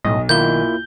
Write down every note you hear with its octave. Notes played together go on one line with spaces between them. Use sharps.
B1 A2 D#5
D#3 A#3 E4 F4 G6 G7